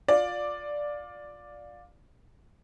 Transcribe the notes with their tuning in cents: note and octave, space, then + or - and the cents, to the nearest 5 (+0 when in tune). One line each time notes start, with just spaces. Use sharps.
F4 +20 D5 +0